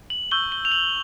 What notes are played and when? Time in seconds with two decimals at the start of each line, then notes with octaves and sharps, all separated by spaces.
0.10 F#7
0.31 C#6 E6 G6 G7
0.52 G7
0.65 F7
0.72 F#7